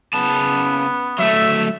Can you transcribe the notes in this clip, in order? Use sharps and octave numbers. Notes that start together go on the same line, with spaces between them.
C#3 B3 A5
F#3 A3 E5